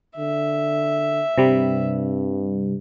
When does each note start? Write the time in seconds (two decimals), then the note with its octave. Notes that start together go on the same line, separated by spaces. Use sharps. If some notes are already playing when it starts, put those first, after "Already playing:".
0.17 D3 E5
1.38 G2 C3 G3